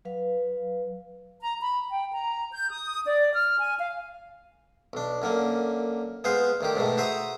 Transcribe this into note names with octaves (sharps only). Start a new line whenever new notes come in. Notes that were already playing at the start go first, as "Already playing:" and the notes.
F#3 B4 F5
A#5
B5
G5
A#5
G6
D#6
D5
F6
G#5
F5
B1 D4
F#2 D3 A#3
G#3 B3 B4 C5 F5
D2 D#3 G4
G#2 B2 D#3 A3
F#4 C5 E5 A#5 D#6